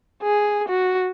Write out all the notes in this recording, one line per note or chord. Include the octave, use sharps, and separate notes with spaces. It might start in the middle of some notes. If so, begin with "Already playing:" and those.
G#4
F#4